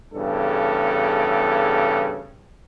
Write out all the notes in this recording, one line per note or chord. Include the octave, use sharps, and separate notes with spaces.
E2 G2 C#3 A4